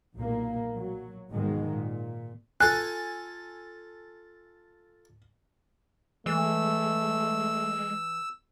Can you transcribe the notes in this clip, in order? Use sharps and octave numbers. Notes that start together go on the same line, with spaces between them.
B1 A#2 A#3
F#3
G#2 B2 D#3 G#3
A#2
F4 A4 G#5 F#6
E3 G#3 A3 E6